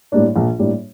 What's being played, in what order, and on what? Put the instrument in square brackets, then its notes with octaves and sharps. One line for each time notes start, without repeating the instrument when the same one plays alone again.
[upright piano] A2 G3 A#3 D4
A#1
A2 G3 A#3 D4